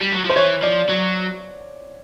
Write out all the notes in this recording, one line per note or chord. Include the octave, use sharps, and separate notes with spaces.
G3
F#3
F3 C5
E3 C#5
F3 D5
F#3